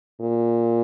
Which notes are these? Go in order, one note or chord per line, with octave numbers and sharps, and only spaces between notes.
A#2